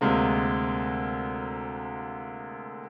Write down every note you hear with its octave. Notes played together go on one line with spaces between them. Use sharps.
D2 C3 G#3 A#3